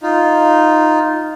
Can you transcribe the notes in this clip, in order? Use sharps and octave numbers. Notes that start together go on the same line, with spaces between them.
D#4 F4